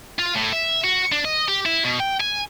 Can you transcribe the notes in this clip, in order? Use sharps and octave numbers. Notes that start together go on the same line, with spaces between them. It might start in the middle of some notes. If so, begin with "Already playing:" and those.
F4
A2
E5
F#4
D4
D#5
G4
E4
B2
G5
G#5